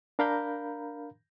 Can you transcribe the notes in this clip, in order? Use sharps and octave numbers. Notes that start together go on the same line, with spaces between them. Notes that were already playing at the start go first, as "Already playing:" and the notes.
D4 A#4 F5 A#5 B5 G6